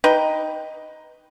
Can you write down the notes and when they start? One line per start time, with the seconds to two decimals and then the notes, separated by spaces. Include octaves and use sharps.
0.04 D#4 B4 G5